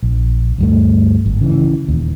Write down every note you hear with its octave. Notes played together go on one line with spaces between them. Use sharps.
A#1
D2 G2 A3
G#1
C#3 E3
D#1 D#2